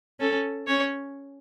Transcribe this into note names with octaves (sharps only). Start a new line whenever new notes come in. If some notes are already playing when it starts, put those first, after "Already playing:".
C#4 A4
C#4 C#5